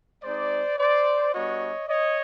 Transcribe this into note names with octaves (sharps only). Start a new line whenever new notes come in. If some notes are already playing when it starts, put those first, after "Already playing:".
G#3 C4 D#4 C5 D5
C5 D5
G3 B3 D4 F#4 C#5 D#5
C#5 D#5